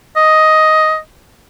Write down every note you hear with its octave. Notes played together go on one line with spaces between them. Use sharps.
D#5